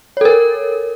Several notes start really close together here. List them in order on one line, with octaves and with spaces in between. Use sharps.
C#5 A4 A#4